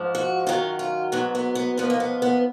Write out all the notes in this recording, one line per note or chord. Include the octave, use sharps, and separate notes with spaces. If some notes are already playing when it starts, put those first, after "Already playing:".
Already playing: G#2 F3
F#4
F#2 D#3 F#3 F4
F4
G#2 F#3 B3
B3
B3
G#2 F3 B3
A#3
B3
B3